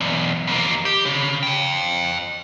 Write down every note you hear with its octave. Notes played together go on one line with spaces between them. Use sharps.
B1 E2
F2 A#3
G4
C#3
F5 G5